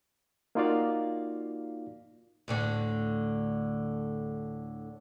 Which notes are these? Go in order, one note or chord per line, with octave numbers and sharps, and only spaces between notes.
A#3 D#4 F4 F#4 D5 F5
D2 A2 D3